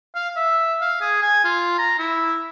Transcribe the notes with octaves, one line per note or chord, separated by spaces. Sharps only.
F5
E5
F5
G#4
G#5
F4
A#5
E4